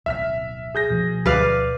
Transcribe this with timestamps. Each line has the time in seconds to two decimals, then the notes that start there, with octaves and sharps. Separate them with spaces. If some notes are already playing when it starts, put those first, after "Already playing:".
0.06 D1 B1 E5 F6 B6
0.75 G#4 G6 A#6
0.90 B2 F3
1.26 D2 B4 D5 F5